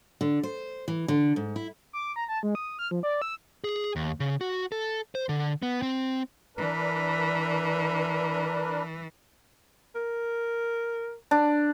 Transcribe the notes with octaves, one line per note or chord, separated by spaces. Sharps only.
D3
C5
E3
D3
G#2
E4
D6
A#5
A5
G#3
D#6
F6
F3
D5
E6
G#4
D#2
C#3
F#4
A4
C5
D3
B3
C4
E3 D4 A#4 B4
A#4
D4